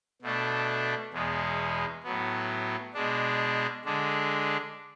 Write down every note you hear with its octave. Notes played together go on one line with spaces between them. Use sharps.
B2 A3 D4
E2 B2 G#3 B3
A2 F#3 B3
B2 G#3 D4
D3 G#3 D4